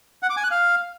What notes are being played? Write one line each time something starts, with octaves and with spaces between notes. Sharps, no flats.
F#5
D6
G#5
F#6
F5